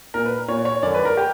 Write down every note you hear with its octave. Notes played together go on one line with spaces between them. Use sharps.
A#2 A#4
B4
A#2 C#5
C#5
F#2 D3 D5
B4
A#4
G4